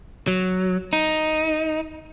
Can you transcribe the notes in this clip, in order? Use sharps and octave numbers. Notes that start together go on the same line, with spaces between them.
F#3
D#4